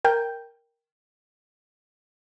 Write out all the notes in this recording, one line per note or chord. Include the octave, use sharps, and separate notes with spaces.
A#4 G5 G6